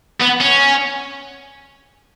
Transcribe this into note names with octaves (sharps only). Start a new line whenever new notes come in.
B3
C#4